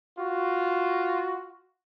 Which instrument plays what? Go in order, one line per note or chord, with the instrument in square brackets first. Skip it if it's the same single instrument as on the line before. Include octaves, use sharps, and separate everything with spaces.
[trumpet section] F4 F#4